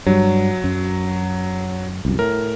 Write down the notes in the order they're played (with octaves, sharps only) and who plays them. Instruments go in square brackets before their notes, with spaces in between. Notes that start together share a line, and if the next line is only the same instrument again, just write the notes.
[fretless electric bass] G2 G3 [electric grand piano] F#3
[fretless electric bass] F#2
C2 F#2
[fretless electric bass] A2 [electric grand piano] A#4